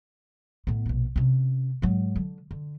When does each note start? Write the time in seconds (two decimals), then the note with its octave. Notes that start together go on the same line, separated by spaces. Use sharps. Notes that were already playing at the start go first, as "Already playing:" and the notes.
0.67 A2 B3
0.86 A#1 B2
1.16 C3 C#4
1.82 G#2 F#3
2.16 D3
2.51 D3